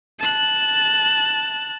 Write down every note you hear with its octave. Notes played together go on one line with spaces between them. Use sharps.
A5 F#6